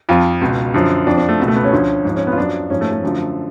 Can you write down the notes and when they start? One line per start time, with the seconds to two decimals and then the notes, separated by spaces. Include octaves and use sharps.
0.09 F2 F3 F4
0.41 C#2 B2
0.74 F#2 D3 F3
1.06 F2 F3 D4
1.18 D4
1.29 A3
1.40 C#2 B2
1.48 A3
1.56 B3
1.64 C#4
1.73 D2 D3 F3
2.05 G#2 F3
2.16 C#4
2.27 B3
2.32 F4
2.38 F#2 F3 D4
2.70 G#2 F3 C#4
2.81 A3
2.92 A3
3.03 F#2 D3 F3